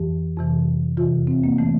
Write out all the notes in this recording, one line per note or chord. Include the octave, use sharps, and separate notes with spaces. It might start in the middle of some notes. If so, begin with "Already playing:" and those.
Already playing: F2 E3 G4
F2 C3 E3
E2 C3 E3 F4
C4
A#3
E3 A3